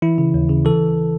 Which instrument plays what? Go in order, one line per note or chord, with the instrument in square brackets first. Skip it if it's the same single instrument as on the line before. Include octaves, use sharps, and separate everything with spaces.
[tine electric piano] E3 E4
C#3
D#2
C#3
E3 A4